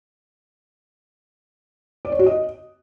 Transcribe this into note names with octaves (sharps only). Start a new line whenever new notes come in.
D5
C#5
F#4
D#5